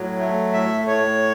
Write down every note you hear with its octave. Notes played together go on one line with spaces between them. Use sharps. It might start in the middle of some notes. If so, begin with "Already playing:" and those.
Already playing: A2 F#3
A3
A2 E5
A2 C#5